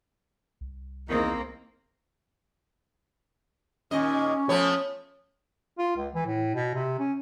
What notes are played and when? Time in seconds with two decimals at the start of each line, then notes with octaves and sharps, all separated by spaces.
0.61 C2
1.08 E2 D#3 A#3 C4 D#4
3.91 D#2 A#2 C#4 D#5
4.49 F3 A3 B3 C#5
5.78 F4
5.97 C#2
6.15 E3
6.27 A2
6.55 B2
6.74 C3
6.99 C#4